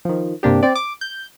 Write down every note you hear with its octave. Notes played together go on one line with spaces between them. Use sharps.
D#3 F3
G2 C3 A#3 D4 G4
C4 D5
D6
G6